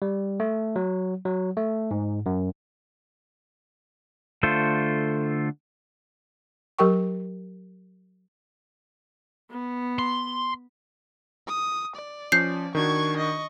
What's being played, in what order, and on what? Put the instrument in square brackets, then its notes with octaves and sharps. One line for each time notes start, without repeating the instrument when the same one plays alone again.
[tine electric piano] G3
A3
F#3
F#3
A3
G#2
F#2
[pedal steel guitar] D3 A3 F4 A4 C5
[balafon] F#3 G4 A#4 G5 C#6
[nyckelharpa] B3
[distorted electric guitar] C6
[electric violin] D#6
D5
[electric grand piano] F3 C#4 [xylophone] G6 C7
[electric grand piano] D#3 D4 F#4 [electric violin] C#6 G#6
[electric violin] D#5 C#6